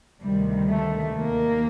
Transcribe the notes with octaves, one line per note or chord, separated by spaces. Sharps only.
D2 C3 D#3 G3
A3
D#2 D#3 A#3